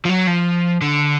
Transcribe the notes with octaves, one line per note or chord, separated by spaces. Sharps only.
F3
F#3
F3
D3